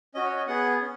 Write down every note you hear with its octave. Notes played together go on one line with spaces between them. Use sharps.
C#4 F#4 D#5
C#5
D#5
B3 G#4 F#5
C#4